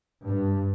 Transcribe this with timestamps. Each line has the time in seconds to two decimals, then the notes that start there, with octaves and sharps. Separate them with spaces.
0.24 G2